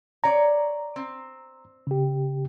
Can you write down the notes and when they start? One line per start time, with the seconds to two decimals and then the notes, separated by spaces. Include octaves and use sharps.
0.24 C#5 D5 A#5
0.96 C4
1.87 C#3 G4